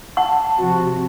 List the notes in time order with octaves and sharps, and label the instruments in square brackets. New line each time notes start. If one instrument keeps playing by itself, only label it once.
[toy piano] F#5 C#6 [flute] A5
[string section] C3 F3 [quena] F#4